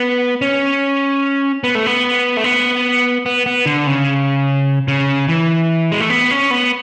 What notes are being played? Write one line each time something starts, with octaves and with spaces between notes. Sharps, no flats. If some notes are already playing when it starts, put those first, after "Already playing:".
Already playing: B3
C#4
B3
A3
B3
A3
B3
B3
B3
D3
C#3
C#3
E3
G#3
A3
B3
C#4
B3